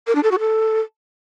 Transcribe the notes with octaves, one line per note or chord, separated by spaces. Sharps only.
A#4
D4
A4
F#4
A4